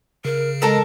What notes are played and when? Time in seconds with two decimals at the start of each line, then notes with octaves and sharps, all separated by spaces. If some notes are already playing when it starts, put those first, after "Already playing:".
0.25 C#3 A#4
0.62 G#3 A4 A#4 A5